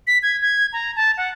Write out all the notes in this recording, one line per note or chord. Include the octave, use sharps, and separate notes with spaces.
B6
G#6
G#6
A#5
A5
F#5